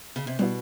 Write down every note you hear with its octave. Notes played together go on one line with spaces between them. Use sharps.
C#3
C3
B2 G3 B3 E4